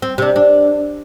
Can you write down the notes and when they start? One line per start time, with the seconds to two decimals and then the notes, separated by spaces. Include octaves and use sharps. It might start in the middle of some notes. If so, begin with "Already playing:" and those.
0.02 C4
0.18 C3 D4
0.36 D4